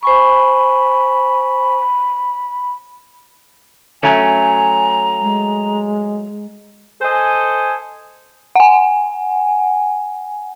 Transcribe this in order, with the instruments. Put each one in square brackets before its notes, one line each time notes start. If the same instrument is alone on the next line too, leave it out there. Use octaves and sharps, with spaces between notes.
[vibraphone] C5 G#5 C#6 [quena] B5
[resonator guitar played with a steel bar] F#3 A3 C#4 [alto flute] G#5 [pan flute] A#5
[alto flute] G#3
[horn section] A4 C5 D#5 G#5
[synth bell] F#5 G#5